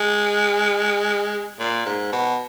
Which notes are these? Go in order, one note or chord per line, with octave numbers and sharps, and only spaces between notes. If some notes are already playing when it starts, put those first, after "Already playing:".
Already playing: G#3
A#2
G#2
B2